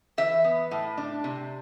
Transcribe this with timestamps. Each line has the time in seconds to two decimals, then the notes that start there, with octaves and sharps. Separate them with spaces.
0.18 E3 E5
0.44 B3
0.71 A2
0.98 D4
1.24 C3